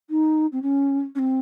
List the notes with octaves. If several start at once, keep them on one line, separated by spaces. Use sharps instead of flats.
D#4
C4
C#4
C#4
C4